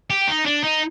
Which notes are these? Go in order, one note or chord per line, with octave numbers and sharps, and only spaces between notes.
G4
D#4
D4
D#4